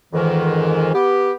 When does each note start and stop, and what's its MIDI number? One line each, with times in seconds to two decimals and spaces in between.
0.13 0.90 41
0.13 0.90 44
0.13 0.90 51
0.13 0.90 52
0.95 1.33 59
0.95 1.33 67